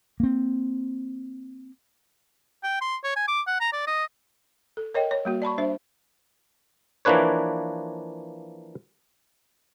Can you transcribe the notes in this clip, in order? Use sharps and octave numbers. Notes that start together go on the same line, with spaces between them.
A#3 C4
G5
C6
C#5
G#5
D6
F#5
A#5
D5
D#5
A4
A#4 C#5 D#5 G5
C#5
G3 A#3 F#4
D5 A5 B5 C#6
G3 D4 C5 E5
E3 F3 A#3 D4 B4 C#5